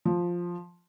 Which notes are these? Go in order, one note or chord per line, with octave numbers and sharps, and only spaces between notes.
F3